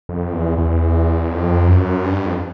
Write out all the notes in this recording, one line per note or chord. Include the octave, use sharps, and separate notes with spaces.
F2
E2
E2
F2
F#2
G2
F2